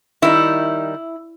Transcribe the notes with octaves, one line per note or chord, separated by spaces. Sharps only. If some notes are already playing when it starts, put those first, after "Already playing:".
D#3 G3 B3 D#4 E4